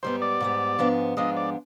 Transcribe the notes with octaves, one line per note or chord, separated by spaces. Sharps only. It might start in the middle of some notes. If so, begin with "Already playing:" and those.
G#2 G3 B3 C5
D5
G#2 G3 B3
G#2 F3 G#3 B3 D4
G#2 F3 G#3 B3 D4 D#5
D5